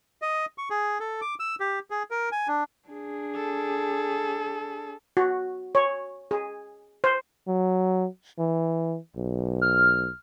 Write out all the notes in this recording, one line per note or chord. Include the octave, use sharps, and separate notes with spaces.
D#5
C#6
G#4
A4
D6
E6
G4
G#4
A#4
G#5
D4
D4 G#4
A4
F#4
C#5
G#4
C5
F#3
E3
B1
F6